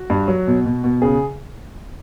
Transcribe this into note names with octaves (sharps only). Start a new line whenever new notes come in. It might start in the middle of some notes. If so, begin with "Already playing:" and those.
Already playing: F#4
G2
F#3
B2
B2
B2
C#3 G#4